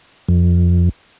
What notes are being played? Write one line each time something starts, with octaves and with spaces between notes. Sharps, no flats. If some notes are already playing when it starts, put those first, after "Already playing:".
F2